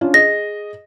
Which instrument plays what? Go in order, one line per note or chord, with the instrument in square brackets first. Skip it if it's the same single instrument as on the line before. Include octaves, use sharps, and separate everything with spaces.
[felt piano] C#4 D4 F4
[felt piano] G#4 D#5 [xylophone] A#6